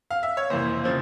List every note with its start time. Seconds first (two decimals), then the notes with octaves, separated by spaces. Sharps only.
0.11 F5
0.23 E5
0.37 C#5
0.50 F2 C3 E3 A#3 C5
0.84 C#3 F3 C4